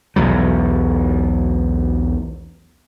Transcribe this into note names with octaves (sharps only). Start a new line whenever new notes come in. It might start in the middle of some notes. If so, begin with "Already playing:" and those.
B1 E2 F#3